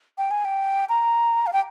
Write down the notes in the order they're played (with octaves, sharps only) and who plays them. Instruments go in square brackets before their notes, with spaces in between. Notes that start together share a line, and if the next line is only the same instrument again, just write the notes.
[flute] G5
G#5
G5
A#5
F5
G5